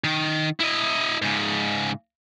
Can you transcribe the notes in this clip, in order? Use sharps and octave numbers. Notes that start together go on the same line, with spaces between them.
D#3
E4 D#5
G#2 C#3